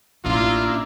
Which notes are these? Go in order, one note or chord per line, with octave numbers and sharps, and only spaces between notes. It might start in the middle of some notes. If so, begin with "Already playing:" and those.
A1 A#3 C#4 D4 E4 F4